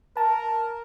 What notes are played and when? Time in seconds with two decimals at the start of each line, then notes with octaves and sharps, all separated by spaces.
0.17 A#4 A5